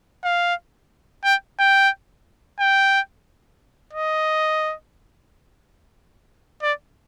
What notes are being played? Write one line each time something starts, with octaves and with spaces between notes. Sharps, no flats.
F5
G5
G5
G5
D#5
D5